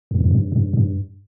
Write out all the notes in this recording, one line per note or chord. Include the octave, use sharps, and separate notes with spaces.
E2
F2
G2
G2
G2